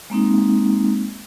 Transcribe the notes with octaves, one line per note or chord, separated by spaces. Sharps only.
G#3 A#3 C4 D#4